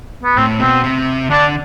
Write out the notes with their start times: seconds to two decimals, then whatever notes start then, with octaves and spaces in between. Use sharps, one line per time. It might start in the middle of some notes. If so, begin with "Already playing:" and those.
0.23 B3
0.37 A2 C4
0.60 B2 C4
0.84 C3
1.30 D3 D4